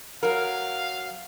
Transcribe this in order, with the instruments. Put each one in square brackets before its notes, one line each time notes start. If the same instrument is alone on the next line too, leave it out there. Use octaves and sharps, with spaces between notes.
[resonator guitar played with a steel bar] F#3 A#4 [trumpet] F5